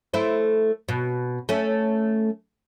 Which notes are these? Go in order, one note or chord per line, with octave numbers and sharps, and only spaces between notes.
A3 E4 C5
B2
A3 C#4